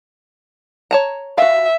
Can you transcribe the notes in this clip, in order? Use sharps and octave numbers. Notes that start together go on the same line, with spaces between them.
C#5 A5 A#5
F#4 E5 F5